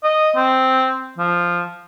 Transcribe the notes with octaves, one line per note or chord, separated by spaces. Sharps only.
D#5
C4
F3